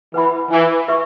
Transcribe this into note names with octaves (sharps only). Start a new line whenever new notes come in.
E3 B4 F#5 B5
E3
B4 E5 C#6